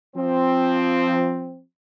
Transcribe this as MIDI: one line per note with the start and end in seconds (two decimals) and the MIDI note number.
0.16 1.63 53
0.16 1.63 60